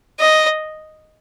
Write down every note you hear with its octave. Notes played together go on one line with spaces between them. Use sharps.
D#5